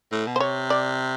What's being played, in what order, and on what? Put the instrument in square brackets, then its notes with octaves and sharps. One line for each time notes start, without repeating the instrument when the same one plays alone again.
[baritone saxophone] A2
B2
[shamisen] C5
[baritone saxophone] C3 [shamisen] C#5
[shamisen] D5